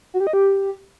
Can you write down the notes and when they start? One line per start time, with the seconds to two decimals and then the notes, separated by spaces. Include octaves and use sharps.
0.14 F#4
0.20 G4
0.27 D#5
0.33 G4